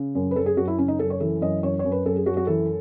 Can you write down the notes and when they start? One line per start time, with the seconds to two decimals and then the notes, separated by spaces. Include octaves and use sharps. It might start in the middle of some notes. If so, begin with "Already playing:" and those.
Already playing: C#3
0.15 F#2
0.31 B4
0.36 F#2 A4
0.46 G#4
0.56 F#2 F#4
0.67 E4
0.78 C#3 C#4
0.88 D#4
0.99 F#2 A4
1.10 C#5
1.20 E3 A4
1.41 F#2 D#5
1.63 F#2 C#5
1.79 C#5
1.85 F#2
1.92 B4
2.05 F#2 A4
2.16 G#4
2.26 F#2 F#4
2.37 F#4
2.47 E3 A4